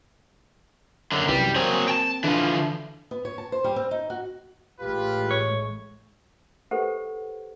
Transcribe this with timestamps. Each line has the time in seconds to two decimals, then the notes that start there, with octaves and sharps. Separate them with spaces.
1.12 F#2 D3
1.28 C2 F#2 E3 G3
1.56 F#3 A#3 C4 G#4
1.88 G5 A5
2.24 D3 E3 F3
3.11 B3
3.25 C#5
3.38 A5
3.52 C5
3.64 G3
3.76 C4
3.91 D#4
4.10 F#4
4.80 A1 A2 G#3 F4 G4 B4
5.31 C#5
6.71 G4 A4 B4 C5 F#5